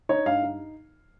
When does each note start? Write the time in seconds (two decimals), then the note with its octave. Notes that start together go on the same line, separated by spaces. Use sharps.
0.09 D#4 C#5
0.26 G2 F5
0.43 D#4